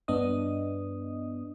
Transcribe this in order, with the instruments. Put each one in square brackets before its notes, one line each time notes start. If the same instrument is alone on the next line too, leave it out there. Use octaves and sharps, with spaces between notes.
[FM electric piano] G2 B3 D4 D#5 D#6